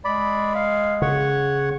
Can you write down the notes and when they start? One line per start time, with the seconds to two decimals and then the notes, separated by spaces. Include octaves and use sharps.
0.05 G#3 D5 B5
0.55 F5
1.02 C#3 C#5 F#5 C#6